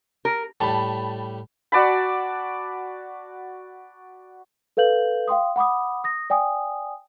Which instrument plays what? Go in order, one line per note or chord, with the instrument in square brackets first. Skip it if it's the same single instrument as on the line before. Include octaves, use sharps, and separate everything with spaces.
[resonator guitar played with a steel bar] A#4
[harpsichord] A2 G3 [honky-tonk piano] A5 B5
[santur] F#4 D5 A5 B5
[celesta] A4 B4 F5 G6 F#7
F5 G5 C6 D#6
F#5 B5 D6 D#6
D#6 A#6
D5 G5 G#5 D#6